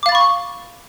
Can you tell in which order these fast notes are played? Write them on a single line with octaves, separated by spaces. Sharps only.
D6 F5 A6 B5 C#6